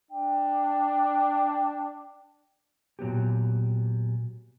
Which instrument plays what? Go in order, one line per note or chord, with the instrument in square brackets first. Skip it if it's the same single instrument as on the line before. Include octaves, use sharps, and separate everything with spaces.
[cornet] D4 [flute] G5
[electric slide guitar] A#2 F#3 B3 G4